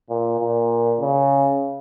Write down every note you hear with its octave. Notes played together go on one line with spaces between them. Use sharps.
A#2
A#2
C#3